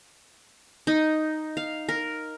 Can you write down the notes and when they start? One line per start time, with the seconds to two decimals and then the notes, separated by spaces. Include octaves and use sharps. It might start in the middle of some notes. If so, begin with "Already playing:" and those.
0.87 D#4
1.57 F5
1.89 A#4